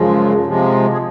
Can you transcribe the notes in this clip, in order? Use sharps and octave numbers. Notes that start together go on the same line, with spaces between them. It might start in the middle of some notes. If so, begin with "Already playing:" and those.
Already playing: F#2 C#3 F3 G#3
C3 F3 G#3
G#4